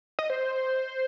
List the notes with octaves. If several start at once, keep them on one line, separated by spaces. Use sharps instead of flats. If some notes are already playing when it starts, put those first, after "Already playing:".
D#5
C5